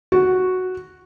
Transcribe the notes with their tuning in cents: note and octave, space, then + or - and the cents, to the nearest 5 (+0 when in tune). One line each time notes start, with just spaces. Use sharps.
F#4 +0